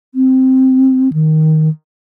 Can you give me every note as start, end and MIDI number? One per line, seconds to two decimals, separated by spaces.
0.15 1.12 60
1.13 1.69 51